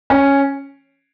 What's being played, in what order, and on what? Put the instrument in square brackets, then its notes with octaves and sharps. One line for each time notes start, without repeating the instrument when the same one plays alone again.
[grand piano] C#4